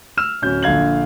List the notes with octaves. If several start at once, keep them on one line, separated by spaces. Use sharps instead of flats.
E6 F6 E7
D1 C#4 G6
A#1 D3 F5 G#6 F#7